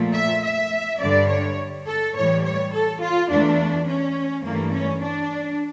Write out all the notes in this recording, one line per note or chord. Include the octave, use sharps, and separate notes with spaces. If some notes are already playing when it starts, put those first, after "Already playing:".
Already playing: A#2 F3 A3
E5
E5
G2 D3 G3 D5
C#5
A4
A2 E3 G3 C#5
C#5
A4
F4
E2 E3 A3 D4
C#4
G2 E3 A3 A#3
C#4
D4